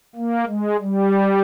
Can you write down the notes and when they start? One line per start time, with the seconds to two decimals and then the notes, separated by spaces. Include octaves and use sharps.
0.16 A#3
0.48 G#3
0.80 G3